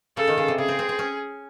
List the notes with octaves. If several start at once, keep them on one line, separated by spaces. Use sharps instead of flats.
C#3 A4
D#3
C#3
C3
C#3 G#4
C4
C4
C4
C#4